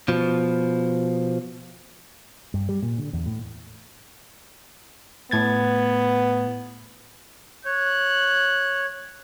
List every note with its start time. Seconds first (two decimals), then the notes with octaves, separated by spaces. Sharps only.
0.08 B2 F3
2.54 G2
2.69 G3
2.82 A#2
2.98 D3
3.13 E2
3.26 A2
5.31 A2 B3 G#6 A6
7.65 C#5 F#6